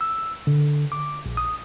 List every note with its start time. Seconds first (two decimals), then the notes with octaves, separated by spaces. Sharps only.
0.01 E6
0.47 D3
0.92 D6
1.26 A#1
1.37 D#6